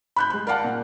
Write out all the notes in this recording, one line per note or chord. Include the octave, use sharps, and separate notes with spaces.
B5 F#6 G6
G#3 F#6
A#4 D5 F5 F#5 A5
A#2